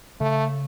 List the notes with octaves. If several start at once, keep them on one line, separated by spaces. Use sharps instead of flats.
C#3 A3